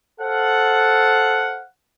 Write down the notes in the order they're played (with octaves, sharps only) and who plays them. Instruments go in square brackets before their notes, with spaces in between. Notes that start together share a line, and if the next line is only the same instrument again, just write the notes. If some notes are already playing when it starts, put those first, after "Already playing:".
[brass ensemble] A4 C5 F5 F#5